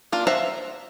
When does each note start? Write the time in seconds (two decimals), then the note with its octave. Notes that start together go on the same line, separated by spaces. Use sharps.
0.12 A#3 D4 F4
0.27 C5 E5 F#5 A#5